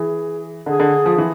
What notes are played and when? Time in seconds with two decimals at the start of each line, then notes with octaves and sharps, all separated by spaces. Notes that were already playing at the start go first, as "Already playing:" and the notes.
Already playing: E3 G#4
0.66 D3 G#4
0.80 D3
1.06 F3
1.18 E3